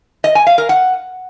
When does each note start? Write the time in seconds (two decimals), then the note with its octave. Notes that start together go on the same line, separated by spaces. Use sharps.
0.24 D#5
0.35 G#5
0.47 F5
0.58 A#4
0.69 F#5